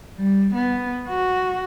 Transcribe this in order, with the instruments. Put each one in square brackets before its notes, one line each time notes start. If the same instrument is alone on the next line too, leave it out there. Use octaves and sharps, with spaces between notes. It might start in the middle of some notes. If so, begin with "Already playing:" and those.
[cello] G3
B3
F#4